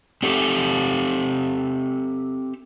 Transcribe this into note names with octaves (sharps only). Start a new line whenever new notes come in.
C4 G4 A4